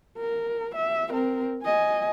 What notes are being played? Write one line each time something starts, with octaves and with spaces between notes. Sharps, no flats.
A#4
E5
C4 A#4
D#5 G#5